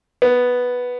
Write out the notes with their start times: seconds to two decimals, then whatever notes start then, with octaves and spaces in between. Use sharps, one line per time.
0.22 B3